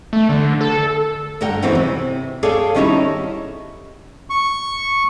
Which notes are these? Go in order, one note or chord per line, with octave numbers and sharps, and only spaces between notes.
A3
D3
A4
G2 D3 A#4 F#5 G5
E2 C#3 E3 F#3 C4 D#4
C3
G#4 A4 C#5 D5 F5 G5
D#3 G3 C#4 D#4 E4 A4
C#6